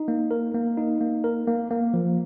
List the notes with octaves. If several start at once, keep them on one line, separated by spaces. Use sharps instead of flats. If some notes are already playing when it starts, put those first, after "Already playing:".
Already playing: D#4
A#3
A#4
A#3
D#4
A#3
A#4
A#3
A#3
F3